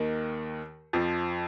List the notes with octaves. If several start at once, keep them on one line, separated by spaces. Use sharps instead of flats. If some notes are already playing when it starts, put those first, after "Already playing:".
Already playing: D#2 D#3
F2 F3